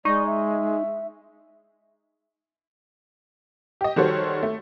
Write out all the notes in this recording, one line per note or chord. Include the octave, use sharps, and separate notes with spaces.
G#3 D#4 D5 C#6
E5
G4 D#5
D#3 G3 F#4 A4 C5 C#5
A3